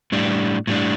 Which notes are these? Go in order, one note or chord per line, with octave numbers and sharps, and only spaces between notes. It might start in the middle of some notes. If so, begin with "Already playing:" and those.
A2 G3 D4
A2 G3 D4